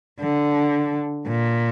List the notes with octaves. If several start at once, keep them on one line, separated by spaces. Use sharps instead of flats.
D3
A#2